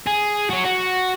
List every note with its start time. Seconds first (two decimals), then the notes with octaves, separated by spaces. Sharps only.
0.07 G#4
0.50 F#4 C#5
0.65 F#4